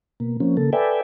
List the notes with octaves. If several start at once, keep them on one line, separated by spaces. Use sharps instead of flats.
B2 A#3
F3 A#3 C4 C#4
C#3 A#3 A4
A4 B4 D5 E5 G5 G#5